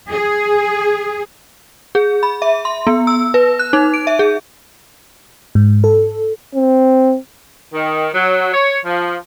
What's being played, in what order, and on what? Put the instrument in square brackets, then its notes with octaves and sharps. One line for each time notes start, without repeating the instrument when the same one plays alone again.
[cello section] G#4
[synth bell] G#4
B5
E5
C6
B3
E6
B4
F#6
D#4
D7
E5
G#4
[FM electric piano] G#2
A4
[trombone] C4
[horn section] D#3
F#3
C#5
F3